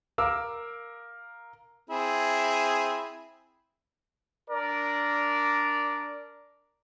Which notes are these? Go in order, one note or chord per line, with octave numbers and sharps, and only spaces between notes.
A#4 F5 D6 E6
C4 E4 G#4
D4 A#4 D5